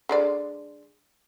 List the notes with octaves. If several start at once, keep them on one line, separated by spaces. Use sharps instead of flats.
D3 G#3 D5